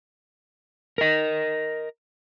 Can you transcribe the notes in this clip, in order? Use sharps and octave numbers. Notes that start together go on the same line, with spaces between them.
A#4 D#5